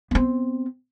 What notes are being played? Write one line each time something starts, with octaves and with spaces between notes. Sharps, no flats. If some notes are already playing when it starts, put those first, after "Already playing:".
B3 C4